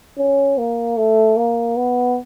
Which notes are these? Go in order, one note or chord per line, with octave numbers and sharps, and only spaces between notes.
C#4
A#3
A3
A#3
B3